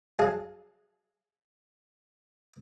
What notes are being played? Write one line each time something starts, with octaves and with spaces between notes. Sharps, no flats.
F#3 G#4 F5 A5